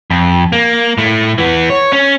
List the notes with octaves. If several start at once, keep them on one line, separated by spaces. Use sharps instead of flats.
F2
A#3
A2 A3
E3 B3
C#5
C#4